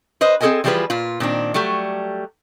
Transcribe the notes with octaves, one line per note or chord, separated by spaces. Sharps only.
B4 C5 D#5
C4 G#4 A4 B4 D#5 G#5
E3 F3 G3 F4 G#4 B4
A#2 F4
A#2 D#3 C4 D4
F#3 G3 A3 G4